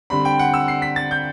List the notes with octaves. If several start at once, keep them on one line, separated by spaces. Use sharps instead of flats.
D3 G3 C4 B5
G5
F#5
E6
C7
B6
A6
G6